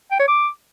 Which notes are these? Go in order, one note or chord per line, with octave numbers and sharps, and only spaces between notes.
G5
C#5
D6